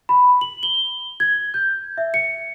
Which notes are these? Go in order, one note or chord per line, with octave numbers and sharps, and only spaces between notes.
B5
F#7
G7
G#6
G6
E5
C#7